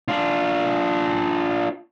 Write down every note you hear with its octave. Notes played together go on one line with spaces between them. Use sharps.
D4 F4